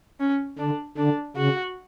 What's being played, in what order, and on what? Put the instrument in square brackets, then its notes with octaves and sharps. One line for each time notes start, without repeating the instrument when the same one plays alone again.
[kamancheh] C#4
[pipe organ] D3 [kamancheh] D4
[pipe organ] D3 [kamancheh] D4
[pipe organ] C#3 [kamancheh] F#4